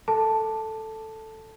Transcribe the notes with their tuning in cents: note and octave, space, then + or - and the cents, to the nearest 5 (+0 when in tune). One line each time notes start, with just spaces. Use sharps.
A4 +0 A5 +0